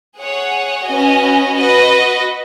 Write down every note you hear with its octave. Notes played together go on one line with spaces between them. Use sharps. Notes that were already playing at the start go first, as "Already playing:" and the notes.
G#4 C#5 F#5
C#4 F#4 B4 D#5 G#5
F#4 B4 D#5